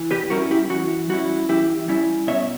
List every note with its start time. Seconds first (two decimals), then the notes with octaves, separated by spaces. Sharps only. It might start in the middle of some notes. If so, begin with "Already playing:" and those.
Already playing: E3
0.11 G4 B4
0.30 G3 C#4 E4 F#4 A#4
0.51 E4 G4
0.70 E3 F#4
1.09 G3 C#4 E4 F#4
1.49 E3 E4 G4
1.88 G3 C#4 E4
2.27 B2 C#5 E5